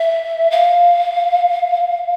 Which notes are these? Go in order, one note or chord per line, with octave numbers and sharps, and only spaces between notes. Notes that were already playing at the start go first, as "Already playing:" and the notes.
Already playing: E5
F5